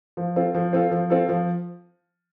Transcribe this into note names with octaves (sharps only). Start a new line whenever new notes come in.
F3
C4 F4 A4
F3
C4 F4 A4
F3
C4 F4 A4
F3